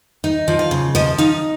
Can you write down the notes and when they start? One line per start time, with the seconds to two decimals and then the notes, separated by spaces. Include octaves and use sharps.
0.24 D#4
0.48 F3
0.59 F5
0.71 C#3
0.95 F3 D#5
1.18 D#4 F5